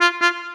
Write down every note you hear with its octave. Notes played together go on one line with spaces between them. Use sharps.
F4
F4